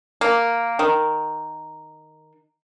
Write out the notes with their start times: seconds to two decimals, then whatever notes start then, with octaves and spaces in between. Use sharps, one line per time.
0.21 A#3
0.79 D#3